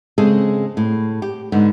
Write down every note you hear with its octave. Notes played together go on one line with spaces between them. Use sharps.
C#3 G#3 C4 G#4 A4
A2
G4
G#2 D3 B3